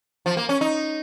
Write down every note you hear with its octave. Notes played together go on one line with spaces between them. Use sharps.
F3
A#3
C#4
D#4